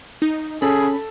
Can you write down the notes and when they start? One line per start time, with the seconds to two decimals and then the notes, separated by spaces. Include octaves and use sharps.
0.22 D#4
0.62 C#4 G#4 A4 B5